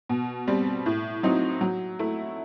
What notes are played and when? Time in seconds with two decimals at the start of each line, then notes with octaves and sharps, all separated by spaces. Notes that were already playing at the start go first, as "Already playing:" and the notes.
0.09 B2
0.47 G3 C4
0.86 A2
1.23 F#3 C4 D#4
1.61 F#3
1.99 A3 E4